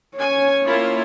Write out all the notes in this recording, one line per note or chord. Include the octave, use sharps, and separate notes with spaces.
C#4 C#5 G#5
A#3 E4 F4